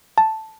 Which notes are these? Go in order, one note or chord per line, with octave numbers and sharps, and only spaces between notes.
A5